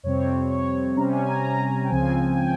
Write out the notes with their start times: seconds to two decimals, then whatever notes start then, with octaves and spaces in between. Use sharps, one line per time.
0.03 F2 C3 G3 C4 C#5
0.50 C#5
0.96 C3 G3 C#4 A#5
1.12 G#5
1.28 A#5
1.42 A#5
1.84 G5
1.89 C#2 C#3 F3 C4 G#5
2.31 G#5
2.35 G5